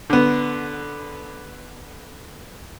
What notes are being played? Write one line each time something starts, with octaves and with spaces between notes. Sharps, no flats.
D3 B3